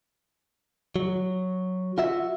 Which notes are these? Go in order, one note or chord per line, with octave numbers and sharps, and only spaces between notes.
F#3
F4 F#4 E5